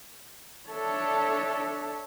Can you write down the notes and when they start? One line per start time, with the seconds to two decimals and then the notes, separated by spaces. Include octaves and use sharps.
0.69 D4 A4 C#5 E5 A5